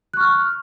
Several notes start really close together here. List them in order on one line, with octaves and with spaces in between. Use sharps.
F#6 C#6 F6